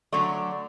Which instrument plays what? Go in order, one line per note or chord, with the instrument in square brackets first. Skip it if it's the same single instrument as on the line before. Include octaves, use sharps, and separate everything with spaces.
[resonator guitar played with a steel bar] D3 F#3 A3 D5